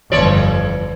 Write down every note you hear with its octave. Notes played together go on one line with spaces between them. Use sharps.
G1 F2 E3 C#5 D5